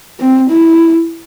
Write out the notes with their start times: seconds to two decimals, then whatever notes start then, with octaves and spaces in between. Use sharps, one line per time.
0.20 C4
0.50 E4